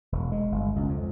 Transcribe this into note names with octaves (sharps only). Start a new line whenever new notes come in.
E1
G#3
G1
C#2
F2